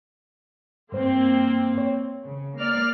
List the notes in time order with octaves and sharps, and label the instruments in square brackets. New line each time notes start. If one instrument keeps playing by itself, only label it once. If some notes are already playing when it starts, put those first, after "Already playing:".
[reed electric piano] G2 C5 [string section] A#3 C4
[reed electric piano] C#5
[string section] C#3
A#3 D5 F6